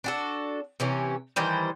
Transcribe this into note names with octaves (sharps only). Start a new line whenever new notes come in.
D4 F#4 A4
C3 E3 C#4
D#3 E3 G3 C5